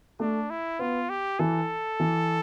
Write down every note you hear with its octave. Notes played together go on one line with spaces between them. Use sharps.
A3 D4
E4
B3 F4
G4
E3 A4
E3